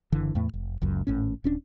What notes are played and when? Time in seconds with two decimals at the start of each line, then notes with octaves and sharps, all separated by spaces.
0.12 F#1 D3 E3
0.35 E2 A2 A3
0.54 F1
0.82 F#1 C#2 F#2
1.07 G#1 A2 C#4
1.44 D#1 C#4 D4